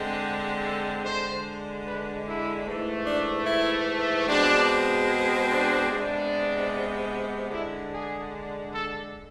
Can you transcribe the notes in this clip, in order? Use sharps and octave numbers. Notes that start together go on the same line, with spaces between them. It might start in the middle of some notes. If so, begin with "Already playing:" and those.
Already playing: D3 G#3 C4
A4
D3 G#3 D4 C5
B4
E4
G#2 E3 A3
D4
E4
B2 G#3 C4 D4
D4
C3 G#3 B3 D4
D4
D3 G#3 D4 E4
G#4
A4